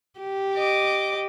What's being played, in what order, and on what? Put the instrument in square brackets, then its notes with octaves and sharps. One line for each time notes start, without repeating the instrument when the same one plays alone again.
[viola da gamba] G4
[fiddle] D#5 D6